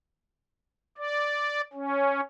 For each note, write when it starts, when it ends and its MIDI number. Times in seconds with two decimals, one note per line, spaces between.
0.98 1.61 74
1.74 2.21 61